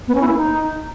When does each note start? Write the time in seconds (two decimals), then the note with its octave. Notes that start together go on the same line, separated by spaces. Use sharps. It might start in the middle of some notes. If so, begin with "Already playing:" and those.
0.07 B3
0.14 C#4
0.21 E4
0.28 A#3
0.35 D#4